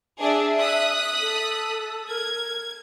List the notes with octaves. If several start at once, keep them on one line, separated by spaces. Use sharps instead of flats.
D4 G#4 E5
D#6 F#6 B6
A4
A#4 G#6